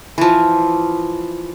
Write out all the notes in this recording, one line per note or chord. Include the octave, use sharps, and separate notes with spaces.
E3 F3